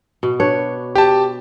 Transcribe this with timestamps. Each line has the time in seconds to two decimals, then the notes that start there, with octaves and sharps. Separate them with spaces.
0.23 B2
0.40 D4 B4 C#5
0.95 G4 A5